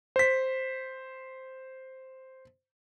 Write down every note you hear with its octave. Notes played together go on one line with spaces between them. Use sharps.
C5 B6